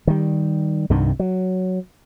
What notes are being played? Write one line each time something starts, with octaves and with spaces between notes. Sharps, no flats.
D#3 G3
C2 G2 C3 D#3
F#3